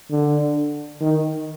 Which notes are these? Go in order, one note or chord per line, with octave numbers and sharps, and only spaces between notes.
D3
D#3